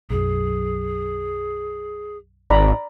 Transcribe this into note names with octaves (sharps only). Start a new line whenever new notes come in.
B1 F#2 G#4
G#1 D5 A#5 B5